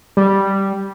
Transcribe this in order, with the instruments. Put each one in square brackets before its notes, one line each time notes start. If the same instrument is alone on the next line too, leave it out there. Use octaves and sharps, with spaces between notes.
[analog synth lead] G3